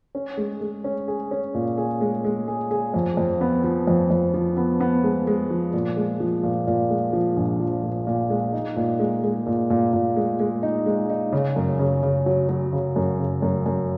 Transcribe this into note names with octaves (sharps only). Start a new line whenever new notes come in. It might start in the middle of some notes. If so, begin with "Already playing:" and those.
C#4
G#3
G#3
C#4
G#4
C#4
A#2
G#4
G#3
G#3
G#4
G#4
F2
F2
B3
F3
F2
F2
F3
B3
B3
G#3
G#3
F3
A#2
G#3
F3
A#2
A#2
G#3
F3
A#1
F3
A#2
A#2
G#3
D#4
A#2
G#3
G#3
A#2
A#2
A#2
G#3
G#3
D#4
G#3
D#4
C#3
F#2
C#3
C#3
F#3
F#3
C#3
F#2
C#3
F#2
F#2